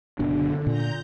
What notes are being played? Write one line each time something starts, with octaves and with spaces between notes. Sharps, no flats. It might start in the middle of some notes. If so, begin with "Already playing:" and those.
F#1 B2 D3 D4
A#2 A#5 G6